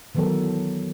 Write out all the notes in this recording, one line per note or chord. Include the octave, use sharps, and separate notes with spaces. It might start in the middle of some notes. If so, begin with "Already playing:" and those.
D#3 E3 F#3 B3 A4 A#4